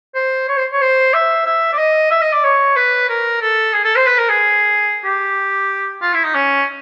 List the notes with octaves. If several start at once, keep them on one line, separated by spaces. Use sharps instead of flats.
C5
C#5
C5
C#5
C5
E5
E5
D5
D#5
E5
D#5
D5
C#5
B4
A#4
A4
G#4
A4
C5
B4
A#4
G#4
G4
F4
E4
D#4
C#4